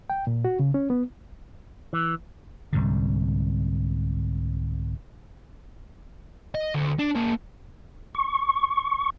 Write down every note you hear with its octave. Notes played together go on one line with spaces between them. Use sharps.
G5
A#2
F#4
C#3
C#4
B3
E3
C2 G#2 D3
D#5
D2
D4
A#3 G#4
C#6